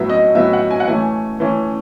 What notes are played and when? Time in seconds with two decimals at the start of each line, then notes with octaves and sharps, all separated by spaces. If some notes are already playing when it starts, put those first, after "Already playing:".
Already playing: A2 F#3 B3 E5
0.10 D#5
0.35 A2 F#3 B3 E5
0.53 F#5
0.71 G#5
0.80 F#5
0.87 E3 A3 C#4 G#5
1.40 E3 A3 C#4